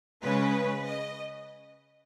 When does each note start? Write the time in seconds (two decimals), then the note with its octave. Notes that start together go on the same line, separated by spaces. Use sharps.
0.22 C#3 G#3 C#4 B4
0.85 D#5